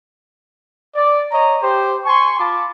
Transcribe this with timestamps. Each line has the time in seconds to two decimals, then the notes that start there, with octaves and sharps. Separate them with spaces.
0.96 D5
1.32 C#5 D#5 A#5
1.62 G4 C5
2.05 G#5 C6 C#6
2.39 F4 A5 B5 D6